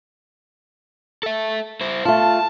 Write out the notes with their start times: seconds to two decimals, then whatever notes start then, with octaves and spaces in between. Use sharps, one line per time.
1.23 A4 E5
1.81 E4 C5
2.05 A3 F4 A5